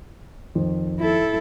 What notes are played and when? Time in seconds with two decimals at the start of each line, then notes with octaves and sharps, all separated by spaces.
0.55 F2 D#3
1.00 E4 A4